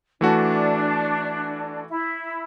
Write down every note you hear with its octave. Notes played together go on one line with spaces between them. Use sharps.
E3 A3 D4 F#4
E4